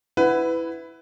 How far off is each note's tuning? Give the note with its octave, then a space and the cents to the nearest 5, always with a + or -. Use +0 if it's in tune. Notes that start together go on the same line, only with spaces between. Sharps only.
E4 +0 B4 +20 F#5 +0